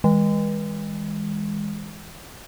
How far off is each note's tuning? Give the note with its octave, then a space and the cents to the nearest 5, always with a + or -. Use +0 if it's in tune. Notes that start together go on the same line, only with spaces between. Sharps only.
E3 -35 G#3 -20